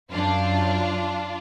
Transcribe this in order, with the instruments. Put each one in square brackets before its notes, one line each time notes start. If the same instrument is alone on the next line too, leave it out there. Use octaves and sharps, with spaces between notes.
[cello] F#2 [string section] D4 F4